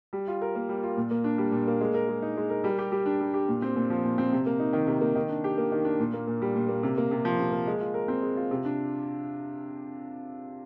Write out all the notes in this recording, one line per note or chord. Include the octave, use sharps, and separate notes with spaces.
G3
F4
A#4
A#3
G3
F4
A#2
A#3
D4
G3
A#2
A#3
G#3
A#4
G#3
D#4
G#3
A#4
G3
G4
G3
D4
G3
G4
A#2
C4
A#2
F3
A#2
C4
C3
A#3
D#4
D#3
C3
A#3
D#3
D4
G4
A#3
D#3
D4
A#2
A#3
A#2
G3
A#2
A#3
C3
A#3
C3
F3
C3
A#3
G#3
F4
A#4
C4
G#3
F4
C3
D4